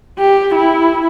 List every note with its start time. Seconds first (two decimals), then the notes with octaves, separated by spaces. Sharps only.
0.19 G4
0.55 E4